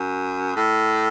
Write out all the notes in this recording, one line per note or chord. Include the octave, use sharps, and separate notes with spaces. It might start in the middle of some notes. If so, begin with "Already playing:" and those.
Already playing: F#2
A2